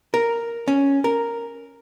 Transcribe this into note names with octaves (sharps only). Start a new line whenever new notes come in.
A#4
C#4
A#4